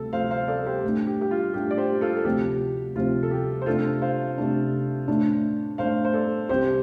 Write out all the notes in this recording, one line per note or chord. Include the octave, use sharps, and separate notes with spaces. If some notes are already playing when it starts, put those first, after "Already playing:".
Already playing: D2 C3 A4
D2 C3 F3 C4 C5 F5
C5 F5
A4 D5
G4 C5
A2 A3 D4
G4
G4
F4
A2 A3 D4 G4
D5
G4 C5
F4 A4
A4
D2 C3 F3 C4 G4
D2 C3 F3 C4 F4
A4
G4
C5
C3 A3 D4 F4 A4
C5 F5
C3 A3 D4
A2 A3 D4
A2 A3 D4 C5 F5
C5
A4 D5
C2 C3 G3 C4 G4 C5